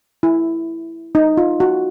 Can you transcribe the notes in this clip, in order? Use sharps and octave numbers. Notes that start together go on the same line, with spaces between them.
E4
D#4
F4
F#4